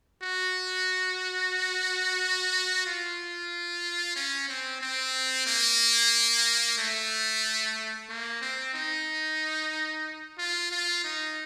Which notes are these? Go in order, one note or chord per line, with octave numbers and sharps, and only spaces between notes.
F#4
F4
C#4
C4
C4
A#3
A3
A#3
C4
D#4
F4
F4
D#4